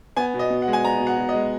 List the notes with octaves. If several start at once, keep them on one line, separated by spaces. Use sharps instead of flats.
B3 G#5
B2
D#5
B2
F#5
G#3
G#5
B3 A#5
B2
F#5
B2
D#5
G#3